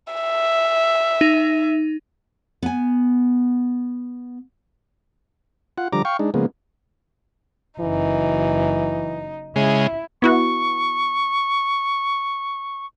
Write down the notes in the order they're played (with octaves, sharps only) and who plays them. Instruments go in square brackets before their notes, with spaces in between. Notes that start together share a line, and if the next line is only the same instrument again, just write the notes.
[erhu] E5
[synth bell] D#4
[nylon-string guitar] B3 G#5
[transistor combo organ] F4 F#5
D3 F3 G3 A#5 D6
F5 G5 C#6
G#3 D4 D#4
C#3 F3 G#3 A#3 B3
[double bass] F#1 F#2 [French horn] E3 [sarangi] D#4
[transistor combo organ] C#3 G#3 [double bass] E4
[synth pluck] B3 E4 F#4 [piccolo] C#6